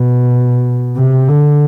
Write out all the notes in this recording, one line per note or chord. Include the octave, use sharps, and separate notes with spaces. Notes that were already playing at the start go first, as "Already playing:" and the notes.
Already playing: B2
C3
D3